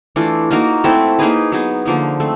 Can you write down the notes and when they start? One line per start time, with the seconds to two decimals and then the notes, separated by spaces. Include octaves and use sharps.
0.16 E3 A3 D4 F4
0.51 A#3 D#4 F#4 A#4
0.84 A3 C4 E4 A4
1.19 A#3 D#4 G#4 B4
1.52 F#3 B3 D#4 G#4
1.85 D3 F3 A#3 D#4
2.20 A3 C4